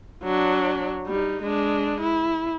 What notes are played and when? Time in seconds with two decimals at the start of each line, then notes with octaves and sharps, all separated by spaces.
0.24 F#3 D4
1.07 G3 D#4
1.42 G#3 D4
2.00 E4